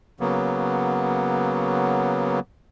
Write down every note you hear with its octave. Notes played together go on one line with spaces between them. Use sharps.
C#3 F#3 A#3 B3